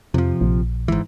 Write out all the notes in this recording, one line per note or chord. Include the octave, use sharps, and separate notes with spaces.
F2 C3 F3
A#1
G#1 G#2 E3